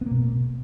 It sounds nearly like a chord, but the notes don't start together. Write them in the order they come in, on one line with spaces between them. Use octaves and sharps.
B3 A#3 B2